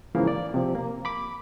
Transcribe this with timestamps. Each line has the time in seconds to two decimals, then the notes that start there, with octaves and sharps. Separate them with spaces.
0.15 G#2 C#3 E3 F3 A#3
0.27 D5
0.54 C3 F3
0.75 A#3
1.05 B5 D6